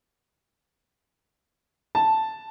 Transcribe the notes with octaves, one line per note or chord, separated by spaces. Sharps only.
A5